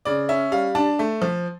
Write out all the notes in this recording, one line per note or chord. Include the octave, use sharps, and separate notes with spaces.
C#3 D5
C#4 E5
G3 F5
D4 A5
A3
F3